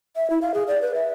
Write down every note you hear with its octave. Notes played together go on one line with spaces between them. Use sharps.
E5
E4
F5
G#4
D5
B4
E5